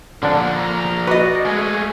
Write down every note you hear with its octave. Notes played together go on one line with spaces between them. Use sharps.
A#2 D3 F3 D4
A#5
F#4 B4 D5 D#5
G#3 A3 G#5